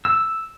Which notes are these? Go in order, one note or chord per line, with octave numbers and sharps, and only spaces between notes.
E6